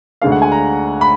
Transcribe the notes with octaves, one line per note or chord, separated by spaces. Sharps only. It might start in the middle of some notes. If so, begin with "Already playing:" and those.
D2 D3 G#3 F5
F#5
G#5
A#5
B5